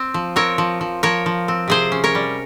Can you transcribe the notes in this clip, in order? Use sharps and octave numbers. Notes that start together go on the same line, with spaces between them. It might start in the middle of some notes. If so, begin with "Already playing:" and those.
Already playing: C4
F3
C4 A#4 C#5
F3
F3
F3 A#4 C#5
F3
C4
C3 G#4 C5
C#4
A#4 C#5
G3